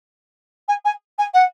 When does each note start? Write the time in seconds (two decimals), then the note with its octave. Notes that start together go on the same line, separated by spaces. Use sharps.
0.68 G#5
0.85 G#5
1.18 G#5
1.33 F#5